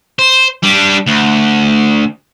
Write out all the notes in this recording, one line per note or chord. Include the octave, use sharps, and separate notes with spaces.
C5
G3 D4
D2